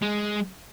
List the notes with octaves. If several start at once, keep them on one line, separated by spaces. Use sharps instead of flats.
G#3